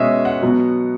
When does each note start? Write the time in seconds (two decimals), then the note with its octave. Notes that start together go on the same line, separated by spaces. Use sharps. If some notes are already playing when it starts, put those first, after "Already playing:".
Already playing: B2 G#3 C#4 D#5 E5
0.25 F#5
0.42 B2 F#3 B3